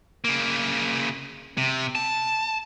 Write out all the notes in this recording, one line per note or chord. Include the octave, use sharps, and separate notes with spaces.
C#3 A#3
C3
A5